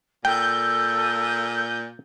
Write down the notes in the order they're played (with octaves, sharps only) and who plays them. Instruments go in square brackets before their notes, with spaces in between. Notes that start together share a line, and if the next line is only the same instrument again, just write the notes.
[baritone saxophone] A#2 [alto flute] A4 [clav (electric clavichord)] G5 [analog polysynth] G6